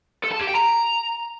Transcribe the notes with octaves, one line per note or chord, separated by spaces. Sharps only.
A4
A5
G4
G5
A#5